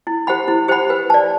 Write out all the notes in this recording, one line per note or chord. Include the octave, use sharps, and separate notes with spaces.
E4
G4 C5 F#5 B5
E4
G4 C5 F#5 B5
B4
D5 A5